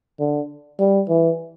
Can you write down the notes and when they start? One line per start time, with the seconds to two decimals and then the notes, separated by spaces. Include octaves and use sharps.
0.20 D3
0.79 G3
1.09 E3